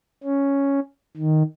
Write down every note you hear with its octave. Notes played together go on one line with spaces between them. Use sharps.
C#4
D#3